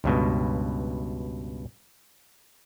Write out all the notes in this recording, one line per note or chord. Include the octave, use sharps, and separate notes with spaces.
C#2 G2 B2